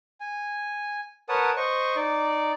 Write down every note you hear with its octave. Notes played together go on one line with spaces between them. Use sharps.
G#5
A#4 B4 C#5 F#5 A5 D#6
C5 D#5 C#6
D#4 D5